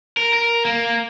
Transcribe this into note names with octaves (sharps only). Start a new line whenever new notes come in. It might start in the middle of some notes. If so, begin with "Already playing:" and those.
A#4
A#4
A#3